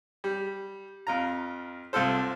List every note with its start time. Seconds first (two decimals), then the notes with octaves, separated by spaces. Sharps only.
0.24 G3
1.07 F2 F4 A#5
1.93 C2 F4 A4 C5